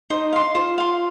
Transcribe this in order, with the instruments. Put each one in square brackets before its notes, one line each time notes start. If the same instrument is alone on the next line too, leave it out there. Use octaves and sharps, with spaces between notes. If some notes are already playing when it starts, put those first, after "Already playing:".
[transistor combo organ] D#4 [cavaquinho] C5
[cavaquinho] F5 C6
[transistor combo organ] F4 [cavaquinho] C5
[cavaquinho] F5 C6